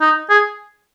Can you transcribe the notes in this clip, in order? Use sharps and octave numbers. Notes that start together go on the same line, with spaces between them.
D#4
G#4